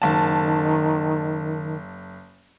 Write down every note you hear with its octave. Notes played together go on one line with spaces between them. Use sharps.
F#1 D#3 A5